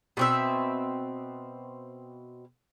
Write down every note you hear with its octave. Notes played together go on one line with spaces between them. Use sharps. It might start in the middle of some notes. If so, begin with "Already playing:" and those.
B2 C4 E5